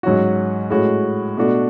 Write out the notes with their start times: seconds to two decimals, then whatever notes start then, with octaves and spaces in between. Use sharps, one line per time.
0.03 G#2 F#3 C#4 F#4
0.70 A2 G#3 C#4 F#4
1.37 B2 A3 D4 F#4